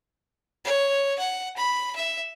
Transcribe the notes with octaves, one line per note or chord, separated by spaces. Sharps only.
C#5
F#5
B5
E5